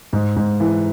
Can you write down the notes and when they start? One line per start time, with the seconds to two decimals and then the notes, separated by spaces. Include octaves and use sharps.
0.13 G#2
0.36 G#2
0.60 E3